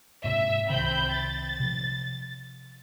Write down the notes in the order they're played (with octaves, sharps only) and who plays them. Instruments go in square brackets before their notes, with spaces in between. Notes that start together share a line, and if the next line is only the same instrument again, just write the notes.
[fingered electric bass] G#2 C3 [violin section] E5
[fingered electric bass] C2 C3 D#3 [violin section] C4 B5 G6
[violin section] A6
[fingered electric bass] C3 F3